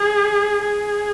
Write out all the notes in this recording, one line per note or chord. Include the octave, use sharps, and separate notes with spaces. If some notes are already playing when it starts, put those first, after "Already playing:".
Already playing: G#4
G#4